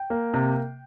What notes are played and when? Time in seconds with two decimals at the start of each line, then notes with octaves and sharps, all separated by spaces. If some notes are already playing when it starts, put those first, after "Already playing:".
Already playing: G5
0.10 A#3
0.34 C3